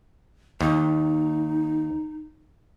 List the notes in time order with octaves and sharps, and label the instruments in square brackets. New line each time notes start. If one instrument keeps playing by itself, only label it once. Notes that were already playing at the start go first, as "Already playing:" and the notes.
[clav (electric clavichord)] D#2 [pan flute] D#4